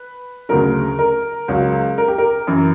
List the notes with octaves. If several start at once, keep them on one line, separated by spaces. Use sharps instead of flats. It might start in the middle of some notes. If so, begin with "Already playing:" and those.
Already playing: B4
D2 C#3 F#3 A#4
A#4
C#2 C#3 F#3
A#4
G4
A#4
F#2 E3